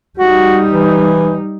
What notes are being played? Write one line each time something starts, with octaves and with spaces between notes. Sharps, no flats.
G3 D#4 F#4
E3